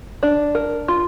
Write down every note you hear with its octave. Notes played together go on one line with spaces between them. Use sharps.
D4
A#4
F4